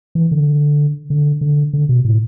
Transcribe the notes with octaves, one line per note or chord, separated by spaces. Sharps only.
E3
D3
D3
D3
D3
B2
A2